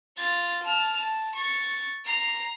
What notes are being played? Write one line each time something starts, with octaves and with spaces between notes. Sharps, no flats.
F4 A6
A5 F6
A5
C#6 A6
A#5 C7